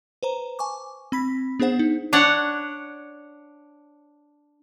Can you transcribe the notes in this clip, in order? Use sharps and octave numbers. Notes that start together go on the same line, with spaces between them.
B4 C5 A#5
G#5 A5 C#6 D6
C4 B5 B6
B3 D4 G#4 C5 F#5
D#4
D4 C#5 F#5